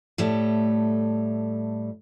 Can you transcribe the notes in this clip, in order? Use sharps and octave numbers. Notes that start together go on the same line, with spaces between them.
A2 G3 A3